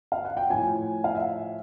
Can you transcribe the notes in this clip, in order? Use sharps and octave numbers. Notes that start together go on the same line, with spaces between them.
F5
F#5
G5
A2 F3 G#5
F5
E5